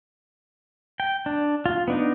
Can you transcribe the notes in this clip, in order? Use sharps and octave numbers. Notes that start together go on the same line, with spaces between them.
G5
D4
F4
B3 D4 D#4